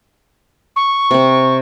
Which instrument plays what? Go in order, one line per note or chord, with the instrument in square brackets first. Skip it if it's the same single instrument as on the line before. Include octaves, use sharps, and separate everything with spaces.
[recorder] C#6
[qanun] C3 C4